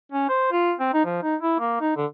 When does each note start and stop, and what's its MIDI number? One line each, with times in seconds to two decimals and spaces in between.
0.12 0.27 61
0.29 0.47 72
0.52 0.73 65
0.80 0.89 60
0.93 1.04 63
1.05 1.22 53
1.23 1.35 63
1.41 1.55 64
1.60 1.80 58
1.81 1.95 63
1.97 2.06 50